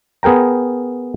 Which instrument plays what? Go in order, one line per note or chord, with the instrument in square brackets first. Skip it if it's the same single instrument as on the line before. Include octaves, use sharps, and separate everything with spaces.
[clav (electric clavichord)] B3 G#4 A#4 G5 A#5